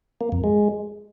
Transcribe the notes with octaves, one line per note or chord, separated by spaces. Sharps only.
A#3
F2
G#3